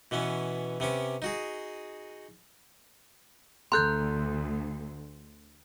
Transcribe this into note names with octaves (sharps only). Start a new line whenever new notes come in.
B2 E3 B3 C#4
C3 B3 C#4 D6
D#4 F#4 G#4
D2 A4 A#5 C6 F#6 G6